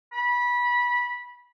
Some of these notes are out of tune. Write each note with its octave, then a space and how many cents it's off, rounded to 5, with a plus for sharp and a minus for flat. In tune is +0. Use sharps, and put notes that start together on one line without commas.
B5 -20